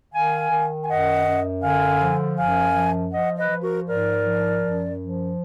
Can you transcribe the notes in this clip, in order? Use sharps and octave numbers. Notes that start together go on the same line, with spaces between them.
D#3 F5 G#5
D#3
G#5
F#2 D#5 F#5
F#2
D3 F5 G#5
F3
F#2 F5 G#5
F3
F3 D#5 F#5
B4 D#5
F3
F#4 A#4
G#2 A#4 D5
F3
F#2
F3